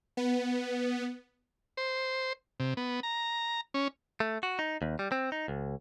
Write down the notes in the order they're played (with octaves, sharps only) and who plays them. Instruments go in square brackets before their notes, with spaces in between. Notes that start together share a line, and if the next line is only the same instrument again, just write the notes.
[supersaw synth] B3
[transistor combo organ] C5
C3
B3
A#5
C#4
[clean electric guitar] A3
F#4
D#4
D#2
G3
C4
D#4
C#2